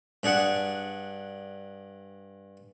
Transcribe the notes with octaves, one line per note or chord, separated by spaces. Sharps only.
G2 D4 G#4 F#5